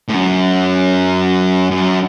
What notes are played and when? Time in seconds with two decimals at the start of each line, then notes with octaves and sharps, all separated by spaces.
0.08 A2
0.14 F#2
1.71 F#2